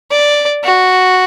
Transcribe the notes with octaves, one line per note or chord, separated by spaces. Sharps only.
D5
F#4